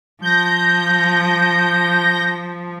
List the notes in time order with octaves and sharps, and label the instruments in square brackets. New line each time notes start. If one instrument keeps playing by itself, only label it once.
[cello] F3 [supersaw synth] G6 A#6